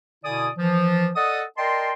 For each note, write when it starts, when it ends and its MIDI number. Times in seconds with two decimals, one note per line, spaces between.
0.24 0.48 47
0.24 0.48 50
0.24 0.48 64
0.24 0.48 74
0.24 0.48 80
0.24 0.48 87
0.57 1.08 52
0.57 1.08 53
1.16 1.42 69
1.16 1.42 74
1.16 1.42 75
1.16 1.42 78
1.16 1.42 87
1.58 1.93 70
1.58 1.93 74
1.58 1.93 75
1.58 1.93 79
1.58 1.93 81
1.58 1.93 84